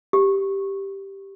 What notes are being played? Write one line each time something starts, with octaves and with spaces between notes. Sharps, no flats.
G4